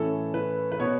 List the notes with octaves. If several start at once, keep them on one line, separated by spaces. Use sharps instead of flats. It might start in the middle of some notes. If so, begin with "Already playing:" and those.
Already playing: A2 E3 A3 C#4 A4
B4
B4
B2 B3 C#5